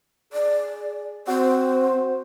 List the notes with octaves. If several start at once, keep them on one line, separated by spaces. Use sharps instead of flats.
G#4 D5
C4 F#4 C5